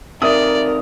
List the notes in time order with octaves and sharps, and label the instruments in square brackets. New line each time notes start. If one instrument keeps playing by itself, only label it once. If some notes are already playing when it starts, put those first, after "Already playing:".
[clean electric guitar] C3 D#3 [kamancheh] A#4 [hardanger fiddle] D5 [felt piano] E5 D#6